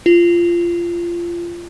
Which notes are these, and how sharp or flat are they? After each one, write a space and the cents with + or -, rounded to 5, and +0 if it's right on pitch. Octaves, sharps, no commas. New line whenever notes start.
F4 -20